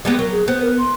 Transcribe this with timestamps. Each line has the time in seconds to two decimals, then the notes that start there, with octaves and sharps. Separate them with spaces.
0.05 G3 G#3 B3
0.19 F#3 A#4
0.32 G#4
0.48 B3 C5
0.62 A#4
0.78 C6